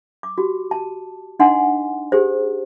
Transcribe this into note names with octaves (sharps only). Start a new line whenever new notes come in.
D6
F#4 G4
A5
D4 D#4 D#5 F#5 G#5 C6
G4 G#4 C5